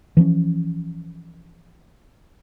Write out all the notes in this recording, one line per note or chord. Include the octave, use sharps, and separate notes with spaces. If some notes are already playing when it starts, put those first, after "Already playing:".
E3 F3 A3 C#4